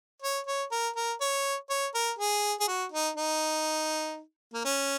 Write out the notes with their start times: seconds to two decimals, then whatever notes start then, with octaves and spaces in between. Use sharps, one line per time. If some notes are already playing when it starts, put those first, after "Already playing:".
0.22 C#5
0.46 C#5
0.71 A#4
0.96 A#4
1.21 C#5
1.70 C#5
1.94 A#4
2.19 G#4
2.60 G#4
2.68 F#4
2.92 D#4
3.17 D#4
4.54 A#3
4.65 C#4